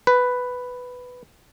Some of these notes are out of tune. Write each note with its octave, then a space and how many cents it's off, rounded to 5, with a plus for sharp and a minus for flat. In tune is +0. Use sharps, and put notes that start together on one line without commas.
B4 +5